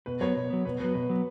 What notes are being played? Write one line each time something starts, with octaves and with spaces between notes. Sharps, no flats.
B2 B4
F#3 B3 C#5
B2
F#3 B3
B2 B4
F#3 B3 B4
B2 B4
F#3 B3